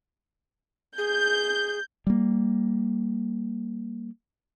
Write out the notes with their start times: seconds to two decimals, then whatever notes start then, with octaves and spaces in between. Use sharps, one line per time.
0.98 G#4 G6
2.07 G3 A#3